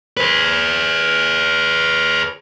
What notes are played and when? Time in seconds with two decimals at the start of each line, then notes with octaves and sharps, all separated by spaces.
0.17 G#4 B4